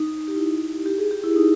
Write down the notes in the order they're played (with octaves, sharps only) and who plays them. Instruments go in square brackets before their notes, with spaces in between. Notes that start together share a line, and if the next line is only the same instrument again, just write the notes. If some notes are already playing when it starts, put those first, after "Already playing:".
Already playing: [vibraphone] D#4
G4
E4
G4
G#4
G4
E4
D#4